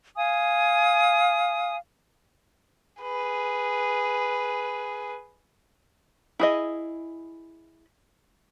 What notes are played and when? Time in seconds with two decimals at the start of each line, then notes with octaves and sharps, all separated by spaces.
0.15 F5 G#5 D#6
3.02 G#4 B4
6.40 E4 G#4 D#5